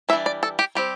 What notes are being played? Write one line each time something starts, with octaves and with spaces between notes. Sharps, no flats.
E3 G3 D4 E5
D5
A4
G4
G3 C4 G4